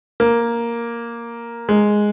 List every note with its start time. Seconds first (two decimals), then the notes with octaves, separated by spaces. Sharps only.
0.20 A#3
1.69 G#3